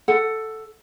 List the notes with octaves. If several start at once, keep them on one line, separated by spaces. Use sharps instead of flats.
A4 F#5